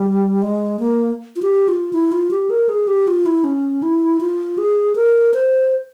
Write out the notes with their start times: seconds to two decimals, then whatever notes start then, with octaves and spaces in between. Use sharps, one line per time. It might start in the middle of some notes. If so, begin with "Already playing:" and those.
Already playing: G3
0.42 G#3
0.79 A#3
1.36 F4
1.42 G4
1.68 F4
1.93 E4
2.12 F4
2.31 G4
2.50 A#4
2.69 G#4
2.87 G4
3.07 F4
3.26 E4
3.44 C#4
3.82 E4
4.20 F4
4.58 G#4
4.95 A#4
5.34 C5